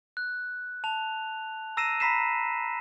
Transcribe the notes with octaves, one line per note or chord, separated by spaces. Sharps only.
F#6
A5 F7
A#5 E6 A#6 C7 D#7 E7
A#5 B5 B6 C7 E7